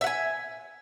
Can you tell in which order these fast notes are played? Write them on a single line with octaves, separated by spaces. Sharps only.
E5 F#5 G#5